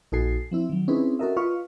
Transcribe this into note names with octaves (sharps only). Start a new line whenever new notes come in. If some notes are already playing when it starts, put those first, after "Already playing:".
A#1 D#4 F#4 A4 G#5 C7
F3 C4 E4
D#3 F#3
C4 C#4 D#4 E4 G#4 B4
C#4 F#4 A4 A#4 D#5 E5
F4 B4 D#5 F5 C#6 F6